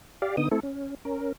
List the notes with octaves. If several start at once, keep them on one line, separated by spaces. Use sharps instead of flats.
G4 D5 F5
D3 B3 D#4 D#6
A3 C4 E4 A4
C#4
C#4 A#4